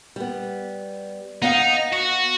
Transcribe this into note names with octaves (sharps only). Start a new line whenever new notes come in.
G3 B3
B3 D#4 F5 F#5
F#4